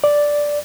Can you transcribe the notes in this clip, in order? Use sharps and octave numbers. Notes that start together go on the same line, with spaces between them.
D5